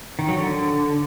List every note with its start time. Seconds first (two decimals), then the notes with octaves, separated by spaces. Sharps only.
0.19 D#3
0.28 F#3
0.38 D3